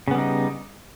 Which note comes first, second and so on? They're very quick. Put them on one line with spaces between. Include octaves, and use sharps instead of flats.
C#3 B3 G3 D#4